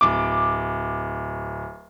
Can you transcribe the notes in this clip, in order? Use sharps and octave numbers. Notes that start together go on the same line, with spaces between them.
D1 D6